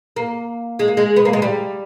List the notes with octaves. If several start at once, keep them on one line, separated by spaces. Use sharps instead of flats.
A#3
G#3
A#3
G#3
B3
A#3
G#3
G3